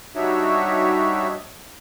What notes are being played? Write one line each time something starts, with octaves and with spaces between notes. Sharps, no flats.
G3 D4 D#4 F#4 C#5 E5